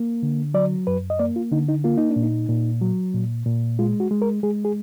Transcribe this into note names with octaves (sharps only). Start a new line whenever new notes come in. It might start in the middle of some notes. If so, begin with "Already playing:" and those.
Already playing: A#3
D3
F#3 D5
F#2 B4
D#5
A#3 D5
F4
D3 D#4
D#4
A#3 F4
D#4
D4
A#2
D#4
A#2
F#3
A#2
A#2
G#3 F4
F#4
G#3
A#4
G#3 G#4
G#4